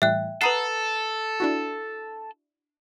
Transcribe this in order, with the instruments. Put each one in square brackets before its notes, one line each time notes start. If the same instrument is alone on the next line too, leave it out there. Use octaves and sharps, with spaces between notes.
[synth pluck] A2 E3 G3 [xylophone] E5 G5 F#6
[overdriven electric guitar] A4 [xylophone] B4 A#5 C7 [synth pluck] F#5 B5 D#6
[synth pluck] D4 E4 F#4